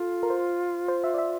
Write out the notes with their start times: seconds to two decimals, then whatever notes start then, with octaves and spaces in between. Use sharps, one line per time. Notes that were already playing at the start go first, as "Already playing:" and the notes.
Already playing: F4 A4
0.23 A#4
0.30 C5
0.88 C5
1.04 E5
1.14 D5
1.18 E5